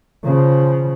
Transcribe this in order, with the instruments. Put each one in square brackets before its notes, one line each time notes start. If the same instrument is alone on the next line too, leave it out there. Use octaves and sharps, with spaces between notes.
[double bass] C#3 F3